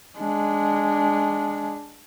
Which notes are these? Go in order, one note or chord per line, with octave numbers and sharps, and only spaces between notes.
G#3 D4